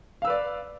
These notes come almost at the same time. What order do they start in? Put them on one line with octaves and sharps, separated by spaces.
F5 E6 B4 D5